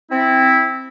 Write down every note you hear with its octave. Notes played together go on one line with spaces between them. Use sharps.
C4 E4